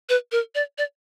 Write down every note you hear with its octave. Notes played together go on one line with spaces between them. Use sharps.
B4
A#4
D5
D5